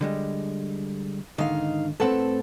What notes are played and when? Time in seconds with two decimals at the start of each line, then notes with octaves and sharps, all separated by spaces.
0.01 D3 G3 G#3
1.38 G#2 D3 D#3 D#4 F5
2.00 A2 C4 A4 B4 F#5